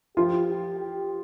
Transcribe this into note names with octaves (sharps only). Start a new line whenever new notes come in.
F3 F4 G4
G4
G4